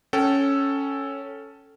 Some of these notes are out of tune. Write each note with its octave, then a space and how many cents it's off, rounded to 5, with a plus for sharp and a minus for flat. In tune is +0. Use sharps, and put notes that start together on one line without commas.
C#4 +0 A4 +0 G5 -35